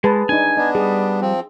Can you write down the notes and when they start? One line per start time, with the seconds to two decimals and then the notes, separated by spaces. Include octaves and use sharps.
0.04 G#3 G#4 B4 A5
0.29 D4 D#4 G#5
0.57 B3 D4 D#5
0.75 G3 G#4
1.22 F3 C4